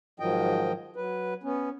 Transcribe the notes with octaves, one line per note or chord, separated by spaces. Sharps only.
G#2 D#3 F3 F#3 D#5 G5
F#3 B4
B3 C#4